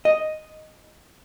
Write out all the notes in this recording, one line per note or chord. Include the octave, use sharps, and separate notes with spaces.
D#5